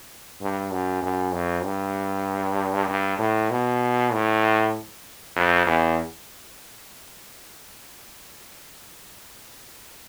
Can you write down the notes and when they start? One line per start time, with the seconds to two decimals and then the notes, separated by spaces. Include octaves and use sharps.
0.41 G2
0.71 F#2
1.02 F#2
1.33 F2
1.64 G2
2.88 G2
3.19 A2
3.50 B2
4.13 A2
5.36 F2
5.67 E2